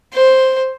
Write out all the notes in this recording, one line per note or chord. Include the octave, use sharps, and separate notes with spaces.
C5